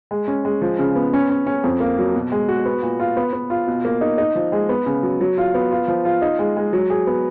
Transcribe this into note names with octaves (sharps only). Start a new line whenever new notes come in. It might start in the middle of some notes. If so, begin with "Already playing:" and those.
G#3
C#4
G#3
F3
C#3
B3
C#4
C#4
C#4
F2
A#3
F#3
B2
G#3
F#4
B3
A#2
F4
B3
B3
F4
B2
A#3
D#4
D#4
F3
G#3
B3
C#3
F#3
F#3
F4
B3
F4
F3
F4
D#4
G#3
G#3
F#3
G#4
B3